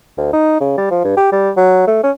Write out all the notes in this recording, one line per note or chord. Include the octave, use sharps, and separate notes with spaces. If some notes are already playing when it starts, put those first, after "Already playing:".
D2
D#4
C#3
G3
F3
G2
G4
G3
F#3
A3
C#4